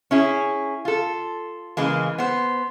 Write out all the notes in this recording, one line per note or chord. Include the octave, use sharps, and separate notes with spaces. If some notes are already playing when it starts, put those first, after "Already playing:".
C#4 E4 G#4
F4 A4
C#3 E3 G#3 A#3
B3 C5